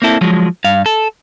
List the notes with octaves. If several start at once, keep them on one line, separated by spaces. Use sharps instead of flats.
A#3 C4 E4 A4
F3 F#3 G#3
G2 F5
A4